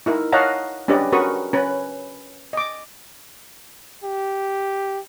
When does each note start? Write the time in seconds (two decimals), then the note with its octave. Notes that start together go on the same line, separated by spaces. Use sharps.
0.06 D#4 E4 A#4
0.32 C#5 D#5 F5 F#5 A5 A#5
0.88 C#4 D4 G4 B4 D5 D#5
1.12 C#4 F#4 A#4 B4 C#6 D#6
1.53 C#4 B4
2.53 D#5 D6
4.04 G4